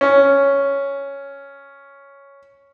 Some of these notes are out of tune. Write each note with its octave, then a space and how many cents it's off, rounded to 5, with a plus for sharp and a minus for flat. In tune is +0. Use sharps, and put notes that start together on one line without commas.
C#4 +0